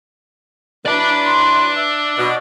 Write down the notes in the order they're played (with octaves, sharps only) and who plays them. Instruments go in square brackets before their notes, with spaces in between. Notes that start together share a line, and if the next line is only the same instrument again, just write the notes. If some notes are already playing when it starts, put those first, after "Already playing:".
[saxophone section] F#3 E4 B4 [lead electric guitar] D5 A5
[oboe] C6
E5
[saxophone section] B2